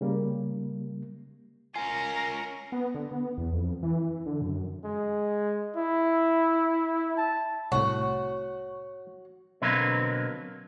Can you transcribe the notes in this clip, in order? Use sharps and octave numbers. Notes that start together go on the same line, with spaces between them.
C#3 G3 A#3
C#4 F4 A#4 G#5
B3
D3
B3
E2
F2
E3
D3
F#2
G#3
E4
A5
C2 A2 F#4 C#5
B2 D3 F#3 A#3 C4 B4